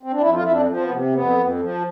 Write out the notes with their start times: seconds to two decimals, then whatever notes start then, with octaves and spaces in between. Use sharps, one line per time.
0.03 C4
0.13 D4
0.21 F2 E4
0.34 F4
0.43 F2 E4
0.52 D4
0.68 F3
0.77 C4
0.83 B3
0.92 C3
1.14 F2 B3
1.38 F2
1.61 F3